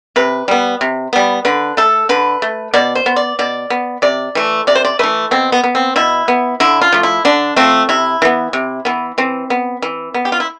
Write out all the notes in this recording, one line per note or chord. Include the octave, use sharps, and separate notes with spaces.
C3 B4
G3 B3
C3
G3 B3
D3 B4
A3 A4
D3 B4
A3
B2 D5
C5
B3
D5
B2 D5
B3
C3 D5
E3 A3
C3 D5
C5
D5
E3 A3 B4
B2 C4
B3
B3
C4
B2 E4
B3
D3 E4
F4
F3 A3
E4
D3 D4
F3 A3 C4
C3 E4
E3 B3
C3
E3 B3
E3 C4
B3
E3
B3
G4
F4
E4